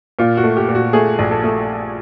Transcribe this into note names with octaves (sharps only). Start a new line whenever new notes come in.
A#2 F4
F#4
A3
G4
A#2
F#4
A3 G#4
A#1
A4
A3